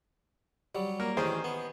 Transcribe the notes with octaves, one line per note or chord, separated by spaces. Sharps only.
F#3 G3
A#3
A1 D#3 C#4 G#4 C5
B3